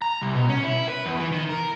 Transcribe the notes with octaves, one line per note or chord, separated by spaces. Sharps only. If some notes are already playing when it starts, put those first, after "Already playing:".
A#5
C2
B2
C#4
E4
B4
E2
E3
D#3
A#4